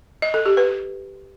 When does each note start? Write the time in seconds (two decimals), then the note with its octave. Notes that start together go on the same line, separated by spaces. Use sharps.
0.22 D#5
0.34 A4
0.46 G4
0.57 B4